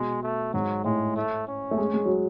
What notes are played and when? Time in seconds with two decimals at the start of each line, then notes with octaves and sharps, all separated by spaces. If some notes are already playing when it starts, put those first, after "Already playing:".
Already playing: B2 G#3
0.23 A3
0.54 G#2 F#3
0.84 A2 G#3
1.16 A3
1.48 C#4
1.71 A3
1.78 G#3
1.93 G#3
2.05 F#3